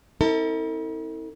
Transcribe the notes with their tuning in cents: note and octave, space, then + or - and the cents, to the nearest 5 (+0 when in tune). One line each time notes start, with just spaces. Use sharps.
C4 +10 E4 -45 A4 +45